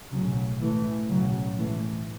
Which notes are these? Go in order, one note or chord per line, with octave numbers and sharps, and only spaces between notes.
B1 A2 C#3 F#3
E3 A3
B1 A2 C#3 F#3
E3 A3